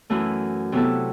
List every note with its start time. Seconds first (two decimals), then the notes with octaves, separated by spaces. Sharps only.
0.10 F#2 E3 A3 E4
0.72 C3 F#3 B3 E4 A4